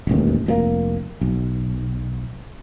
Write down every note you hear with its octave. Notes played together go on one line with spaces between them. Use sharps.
E1 A1 D#2
F1 A#2 A#3
B1